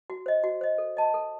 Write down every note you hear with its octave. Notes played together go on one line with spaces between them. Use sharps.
F#4
C5 D#5
F#4
C5 D#5
A4
D#5 A5
A4